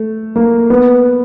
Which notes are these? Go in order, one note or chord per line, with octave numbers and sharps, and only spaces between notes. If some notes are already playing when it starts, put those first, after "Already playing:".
Already playing: A3
A#3
B3